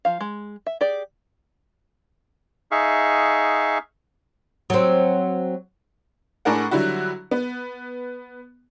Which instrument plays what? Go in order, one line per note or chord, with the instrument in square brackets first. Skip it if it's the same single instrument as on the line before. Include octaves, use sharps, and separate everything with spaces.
[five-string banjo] F3 F5
G#3
E5
G4 G#4 D5
[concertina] D#4 G#4 E5 F5 C#6
[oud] F#3 C4
[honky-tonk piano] A2 D4 G#4 A#4 F#5
D3 F#3 G3 E4 F#4
B3